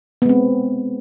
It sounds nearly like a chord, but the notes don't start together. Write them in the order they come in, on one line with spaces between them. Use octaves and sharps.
B3 G#3 C4